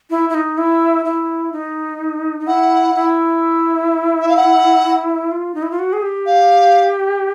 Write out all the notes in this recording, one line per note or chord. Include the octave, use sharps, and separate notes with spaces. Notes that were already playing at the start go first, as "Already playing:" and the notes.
E4
E4
D#4
E4
E4
D#4
D#4
E4 F#5
E4
E5
F5
F#5
F4
D#4
E4
F4
F#4
G#4
G4
F5